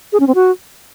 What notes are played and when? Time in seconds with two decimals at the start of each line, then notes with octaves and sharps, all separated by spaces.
0.13 G#4
0.20 C#4
0.27 C4
0.35 F#4